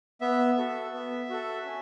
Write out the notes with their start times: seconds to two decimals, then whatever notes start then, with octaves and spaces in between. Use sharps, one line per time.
0.21 B3 E5
0.58 F#4 A4
0.93 B3
1.29 F#4 A4
1.65 C#4